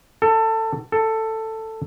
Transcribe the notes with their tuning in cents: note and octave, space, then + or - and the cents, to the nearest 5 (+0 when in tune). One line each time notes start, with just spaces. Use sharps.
A4 +20
A4 +10